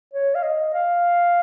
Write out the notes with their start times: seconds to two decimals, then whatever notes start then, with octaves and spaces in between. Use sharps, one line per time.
0.14 C#5
0.35 F5
0.43 D#5
0.74 F5